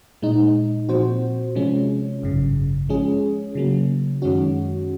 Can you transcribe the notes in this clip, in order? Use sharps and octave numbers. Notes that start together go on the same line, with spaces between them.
A#2 G#3 D#4
A#2 F3 C4 F#4 C5
C3 F3 G#3 C#4
G#1 F#2 C#3
F3 G#3 C#4 G#4
C#3 F#3 A#3
F#2 D#3 G#3 C#4 F#4